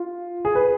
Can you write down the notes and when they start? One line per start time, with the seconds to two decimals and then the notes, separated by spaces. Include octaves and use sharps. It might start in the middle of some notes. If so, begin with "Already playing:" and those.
Already playing: F4
0.45 G#4
0.55 B4